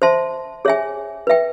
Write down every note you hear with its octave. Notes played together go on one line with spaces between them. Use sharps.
C5 E5 A5 C6
G#4 C#5 E5 G#5
B4 E5 G5